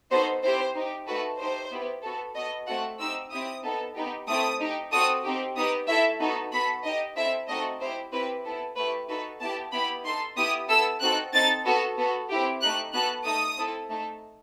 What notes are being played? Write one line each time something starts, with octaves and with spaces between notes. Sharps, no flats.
B3 D#4 F#4 A4 C5
C4 E4 G4 C5
D#4 G4
A3 D#4 F#4 A4 B4
A3 D#4 G4 C5
B3 E4 G4
B3 F#4 A4
B3 F#4 A4 D#5
A3 C4 F#4 A4 F#5
C4 D#4 G4 E6
C4 E4 G4 D#6
B3 D#4 A4
B3 D#4 G4
A3 C4 E4 A4 D#6
D#4 G4
C4 F#4 A4 D#6
C4 D#4 G4
B3 D#4 G4 D#6
A3 E4 A4 E5
B3 D#4 F#4 A4
B3 F#4 A4 B5
D#4 G4 D#5
C4 E4 A4 E5
A3 C4 D#4 F#4 A4 D#5
C4 E4 G4 C5
C4 E4 G4 B4
B3 E4 A4
A3 E4 G4 B4
D#4 F#4 A4 B4
B3 E4 G4 A5
B3 E4 G4 B5
D#4 A4 C6
B3 E4 G4 D#6
B3 E4 A4 E6
C4 D#4 F#4 A4 F#6
C4 D#4 A4 A6
B3 F#4 A4
B3 F#4 A4
C4 E4 G4
A3 D#4 G4 F#6
B3 F#4 A4 F#6
A3 D#4 A4 D#6
C4 E4 A4
A3 D#4 A4